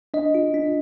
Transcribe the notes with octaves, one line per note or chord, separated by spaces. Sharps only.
D4 D#5
F4
D4